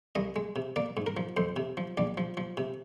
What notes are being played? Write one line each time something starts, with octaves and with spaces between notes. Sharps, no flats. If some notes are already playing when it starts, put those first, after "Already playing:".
C2 D#5
G#3
C3
A#3 D5
G#2
A#4
F3
F2 C5
C3
F3
A#1 D5
F3
F3
C3